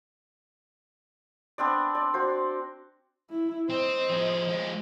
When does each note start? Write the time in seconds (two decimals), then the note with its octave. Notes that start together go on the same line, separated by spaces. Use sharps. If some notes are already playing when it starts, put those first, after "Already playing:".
1.58 B3 C4 D4 D5
1.95 D5
2.14 F#4 C5
3.30 E4
3.70 C4 C5 D#5
4.10 F3 G#4
4.48 F3 G#3